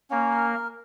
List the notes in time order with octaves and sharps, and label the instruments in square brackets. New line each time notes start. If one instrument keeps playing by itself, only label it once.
[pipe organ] A#3 [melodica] C#4
[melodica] A#4